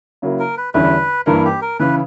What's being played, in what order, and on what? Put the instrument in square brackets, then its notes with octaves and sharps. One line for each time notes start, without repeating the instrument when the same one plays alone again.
[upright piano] C#3 F#3 A#3 E4
[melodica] A#4
B4
[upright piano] E2 D3 G3 C#4 E4 [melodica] B4
[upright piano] G2 E3 A#3 [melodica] A#4
[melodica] G4
A#4
[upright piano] C#3 E3 [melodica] B4